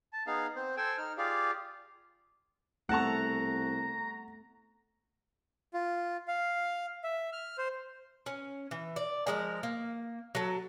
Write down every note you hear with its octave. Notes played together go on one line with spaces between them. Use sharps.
A5
B3 D#4 G#4 F5
C4 C5
A4 C5 G5 G#5 E6
D#4 F6
F4 G4 G#4 D5 F5
C2 A3 B3 A4 F#5 A5 A#5 C#6
F4
F5
E5
F6
C5
C#4
E3
D5
F3 G#3 A#4
A#3
F#3 A4